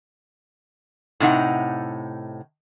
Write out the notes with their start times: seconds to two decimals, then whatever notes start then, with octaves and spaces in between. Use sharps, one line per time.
1.20 A2 C3 D#4 F#5